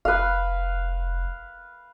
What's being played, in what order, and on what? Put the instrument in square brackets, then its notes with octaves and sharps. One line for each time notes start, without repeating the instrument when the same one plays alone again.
[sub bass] F1 [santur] B4 F5